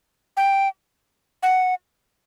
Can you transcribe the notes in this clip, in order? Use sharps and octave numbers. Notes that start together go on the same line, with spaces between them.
G5
F#5